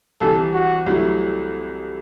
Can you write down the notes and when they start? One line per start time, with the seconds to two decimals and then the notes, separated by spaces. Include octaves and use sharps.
0.21 C2 C3 E3 A4
0.53 F#4
0.86 C2 C3 F#3 A3 E4